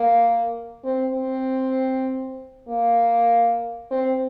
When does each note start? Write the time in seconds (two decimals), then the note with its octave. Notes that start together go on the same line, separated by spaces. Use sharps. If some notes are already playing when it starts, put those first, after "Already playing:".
Already playing: A#3
0.84 C4
1.14 C4
2.68 A#3
3.91 C4